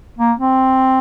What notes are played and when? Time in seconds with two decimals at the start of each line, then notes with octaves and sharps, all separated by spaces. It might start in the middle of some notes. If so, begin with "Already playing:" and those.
0.18 A#3
0.40 C4